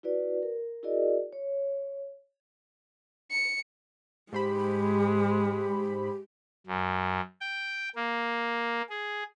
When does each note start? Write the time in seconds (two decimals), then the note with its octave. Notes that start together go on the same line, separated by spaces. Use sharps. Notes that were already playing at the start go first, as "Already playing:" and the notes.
0.03 E4 F#4 B4 D5
0.43 A#4
0.83 E4 F#4 G#4 A#4 D5 D#5
1.33 C#5
3.31 C#7
4.33 G#2 G#3 G4 C5 B5
6.67 F#2
7.41 G5
7.96 A#3
8.90 G#4